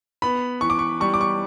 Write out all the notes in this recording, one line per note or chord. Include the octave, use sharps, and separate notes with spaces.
B3 B5
E3 C#6
D6
C#6
G3 C#6
D6
C#6